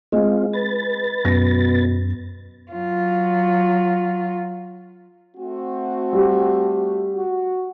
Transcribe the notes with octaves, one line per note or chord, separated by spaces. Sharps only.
G#3 C4 F4
B4 A6
F#2 B2 A#6
F#3 F4
A3 C4 F#4
G3 G4
F#4